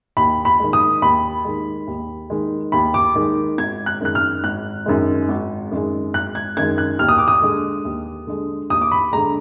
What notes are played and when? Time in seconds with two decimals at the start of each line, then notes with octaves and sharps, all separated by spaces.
0.17 D#2 B5
0.45 B5
0.60 D#3 G#3
0.73 D#6
1.02 D#2 B5
1.44 D#3 G#3
1.87 D#2
2.30 D#3 G#3
2.72 D#2 B5
2.94 D6
3.15 D#3 G#3
3.58 G#1 G#6
3.86 F#6
4.00 F#2 D#3 G#3 F#6
4.15 F6
4.44 G#1 F#6
4.86 F#2 D#3 G#3
5.29 G#1
5.71 F#2 D#3 G#3
6.14 G#1 F#6
6.35 G#6
6.57 F#2 D#3 G#3 G#6
6.78 F#6
6.99 D#2 F6
7.09 D#6
7.18 D6
7.28 D#6
7.42 D3 G#3
7.85 D#2
8.27 D3 G#3
8.70 D#2 D#6
8.81 D6
8.92 B5
9.13 D3 G#3 A#5